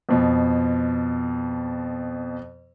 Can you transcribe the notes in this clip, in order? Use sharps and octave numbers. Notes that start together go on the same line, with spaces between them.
F2 B2